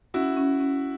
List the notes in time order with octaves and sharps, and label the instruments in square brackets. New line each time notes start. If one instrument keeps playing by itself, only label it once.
[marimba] C#4 [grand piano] E4 F#4
[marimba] C#4
C#4